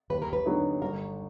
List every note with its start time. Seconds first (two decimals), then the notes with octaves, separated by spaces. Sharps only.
0.10 D#2 B4
0.22 A#4
0.33 B4
0.45 D3 F#3 B3 D#4
0.81 G1 A#4